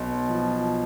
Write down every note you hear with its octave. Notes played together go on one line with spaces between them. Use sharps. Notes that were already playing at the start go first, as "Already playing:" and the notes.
Already playing: B1
F3